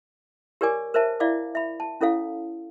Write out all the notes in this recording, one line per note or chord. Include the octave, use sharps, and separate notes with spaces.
G4 A#4 C#5 D5 G#5 D6
A#4 C5 C#5 E5 A5
E4 D5 E5 F5 D6
E5 B5
A5
C#4 E4 A4 C#5 F5